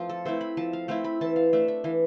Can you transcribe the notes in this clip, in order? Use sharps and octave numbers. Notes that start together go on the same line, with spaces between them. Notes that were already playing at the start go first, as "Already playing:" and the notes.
Already playing: F3 A3 C4 F4
A4
A3 C4 E4 C5
B5
F3 A5
F5
A3 C4 E4 F5
B5
E3 A5
F5
A3 D4 E5
E5
E3 F5